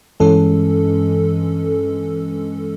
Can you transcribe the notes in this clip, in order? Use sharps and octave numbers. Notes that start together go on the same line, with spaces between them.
G2 E3 G#3 C#4 A4